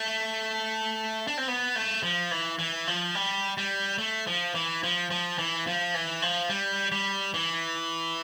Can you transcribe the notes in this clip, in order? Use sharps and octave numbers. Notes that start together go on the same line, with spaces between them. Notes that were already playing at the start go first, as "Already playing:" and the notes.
Already playing: A3
D4
C4
B3
A3
F3
E3
E3
F3
G3
G3
A3
F3
E3
F3
F3
E3
F3
E3
F3
G3
G3
E3